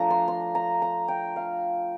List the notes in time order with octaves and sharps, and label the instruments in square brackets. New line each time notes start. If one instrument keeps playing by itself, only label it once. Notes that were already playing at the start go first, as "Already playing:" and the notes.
Already playing: [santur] F3 A3 D4 A#5
C6
C6
A#5
A#5
G5
F5